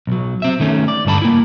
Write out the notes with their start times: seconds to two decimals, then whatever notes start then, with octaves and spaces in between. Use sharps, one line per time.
0.07 B1 F#3
0.42 C4 E5
0.60 D#3 A3 C#4
0.88 D5
1.05 D2 G2 D3 A5 B5
1.22 A#3 E4